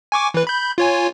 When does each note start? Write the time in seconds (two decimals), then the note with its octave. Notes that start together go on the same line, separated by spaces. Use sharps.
0.12 G#5 C#6 D6
0.34 E3 B4
0.47 B5 G6
0.78 F4 C#5 G#5